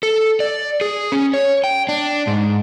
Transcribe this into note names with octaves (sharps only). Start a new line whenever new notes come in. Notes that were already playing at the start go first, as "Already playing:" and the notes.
A4
D5
G#4
C#4
C#5
G5
D4
G#2